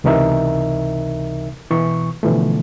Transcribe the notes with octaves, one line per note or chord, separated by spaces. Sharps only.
C#2 C3 E3 D#4 A#4 E5
B2 E3 C#6
B2 D3 E3 F3 A3